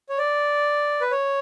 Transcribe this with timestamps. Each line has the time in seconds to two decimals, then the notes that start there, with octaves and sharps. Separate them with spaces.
0.09 C#5
0.18 D5
1.01 B4
1.11 C#5